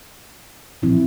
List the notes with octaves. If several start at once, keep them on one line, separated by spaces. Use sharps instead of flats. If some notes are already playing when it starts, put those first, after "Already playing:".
A#2 F3 C4 E4